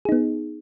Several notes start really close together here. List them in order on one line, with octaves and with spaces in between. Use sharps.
G#4 D#4 B3